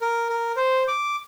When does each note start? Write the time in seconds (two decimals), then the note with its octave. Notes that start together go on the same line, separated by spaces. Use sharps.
0.01 A#4
0.29 A#4
0.56 C5
0.88 D6